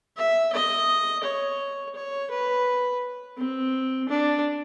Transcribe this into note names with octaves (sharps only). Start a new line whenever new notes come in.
E5
D#5
C#5
C#5
B4
C4
D4